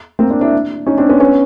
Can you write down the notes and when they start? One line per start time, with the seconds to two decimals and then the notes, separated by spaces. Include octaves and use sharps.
0.19 A#3 C4
0.30 C4 D4
0.41 D4 E4
0.87 C#4 D#4
0.98 C4 D4
1.09 B3 C#4
1.20 B3 C#4